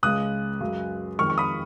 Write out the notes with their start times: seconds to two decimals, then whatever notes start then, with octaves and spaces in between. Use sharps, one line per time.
0.03 C#2 C#3 G#3 D#6 F#6
0.61 F#2 C#3 G#3
1.19 F2 D#3 G#3 C#6 F6
1.30 C#6
1.38 B5 D#6